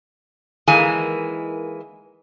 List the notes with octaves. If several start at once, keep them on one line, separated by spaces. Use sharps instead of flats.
D#3 E3 G#3 A#3 G#5